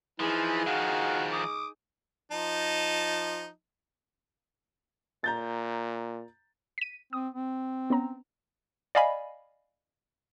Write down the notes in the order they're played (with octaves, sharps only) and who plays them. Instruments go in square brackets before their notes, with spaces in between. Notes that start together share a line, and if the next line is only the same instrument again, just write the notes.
[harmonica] E3 [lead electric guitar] F3 [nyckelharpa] D#4 G#4
[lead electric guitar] D#3 F3 [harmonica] F#4 F5
[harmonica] D6 D#6
F3 D#4 A5
[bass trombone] A#2 [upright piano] A#5 G6 A6
[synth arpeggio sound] B6 D#7
[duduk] C4 [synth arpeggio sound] D#6
[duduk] C4
[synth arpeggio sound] B3 C#4 A#5
[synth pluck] D5 D#5 F5 G#5 B5